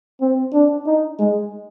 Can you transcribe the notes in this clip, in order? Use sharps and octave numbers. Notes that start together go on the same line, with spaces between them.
C4
D4
D#4
G#3